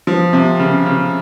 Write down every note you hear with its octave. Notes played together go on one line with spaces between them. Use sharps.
F3
C3
C#3
C#3